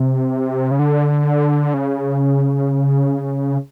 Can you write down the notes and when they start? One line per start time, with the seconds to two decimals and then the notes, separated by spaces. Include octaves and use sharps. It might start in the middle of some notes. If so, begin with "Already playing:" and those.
Already playing: C3
0.71 C#3
0.79 D3
1.74 C#3